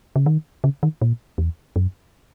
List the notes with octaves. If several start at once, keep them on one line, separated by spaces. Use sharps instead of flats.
C#3
D#3
C#3
D#3
A#2
E2
F#2